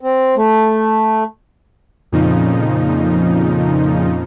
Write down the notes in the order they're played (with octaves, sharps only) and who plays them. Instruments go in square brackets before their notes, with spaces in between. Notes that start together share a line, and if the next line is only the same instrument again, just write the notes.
[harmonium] C4
A3
[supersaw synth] F2 A#2 C#3 F3 D#4